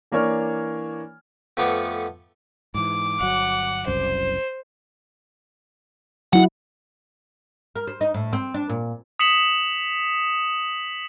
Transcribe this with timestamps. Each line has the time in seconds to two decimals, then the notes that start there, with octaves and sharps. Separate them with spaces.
0.12 E3 A#3 D4 C#5 F6
1.57 F2 A3 B3 A4 C#5 D5
2.74 G#2 E3 D6
3.20 G1 F#3 F#5
3.87 F#1 C2 F#2 C5
6.33 F#3 E4 F#5
7.76 A#4
7.88 C5
8.01 D#4
8.14 A2
8.33 C4
8.54 D4
8.69 A#2
9.19 D#6 B6 C#7 E7 F#7